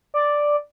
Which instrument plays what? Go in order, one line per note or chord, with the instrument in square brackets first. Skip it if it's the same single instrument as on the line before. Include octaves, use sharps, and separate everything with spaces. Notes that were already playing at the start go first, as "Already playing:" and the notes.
[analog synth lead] D5